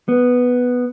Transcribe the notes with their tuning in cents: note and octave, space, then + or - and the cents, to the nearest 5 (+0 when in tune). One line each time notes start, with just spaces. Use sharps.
B3 +0